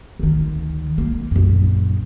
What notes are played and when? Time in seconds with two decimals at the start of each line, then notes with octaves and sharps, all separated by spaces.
0.19 D2 D#3
0.98 A#3
1.31 A#1 F#2